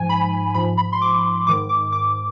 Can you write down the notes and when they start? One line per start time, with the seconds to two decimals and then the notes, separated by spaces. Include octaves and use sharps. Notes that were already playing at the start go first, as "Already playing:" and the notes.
Already playing: G#2 F3 G#5
0.09 B5
0.55 G#2 F3 B5
0.77 B5
0.92 C6
1.01 D6
1.47 G#2 D#3 D6
1.69 D6
1.92 D6